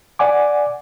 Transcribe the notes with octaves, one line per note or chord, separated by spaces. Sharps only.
D5 F#5 G#5 D6